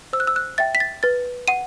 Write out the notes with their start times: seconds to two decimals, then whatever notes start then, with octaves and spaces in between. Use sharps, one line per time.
0.13 C5 E6
0.20 F#6
0.27 E6
0.36 F#6
0.58 E5 G5 A6
0.75 B6
0.80 A6
1.03 B4 A6
1.48 F#5 D#7